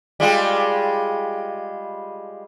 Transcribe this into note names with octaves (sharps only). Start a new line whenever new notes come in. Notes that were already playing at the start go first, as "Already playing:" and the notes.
G3 G#3 F4